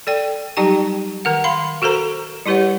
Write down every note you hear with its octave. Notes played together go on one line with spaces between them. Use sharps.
A4 D5 G5
F#3 G3 D#4 G4 G5 A5
D#3 A#4 F#5
F5 B5 C6
F#4 A4 A#4 C5 A#5
G3 E4 G4 B4 C#5 F#5